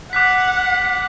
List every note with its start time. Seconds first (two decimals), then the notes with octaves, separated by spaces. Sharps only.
0.13 F#5 D6 F#6 B6